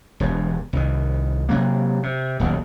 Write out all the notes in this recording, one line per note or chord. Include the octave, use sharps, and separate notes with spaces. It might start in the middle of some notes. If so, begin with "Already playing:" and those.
E1 G2
C2 D#3
C3 F#3 A#3
C3
D#1 B1 C3 D#3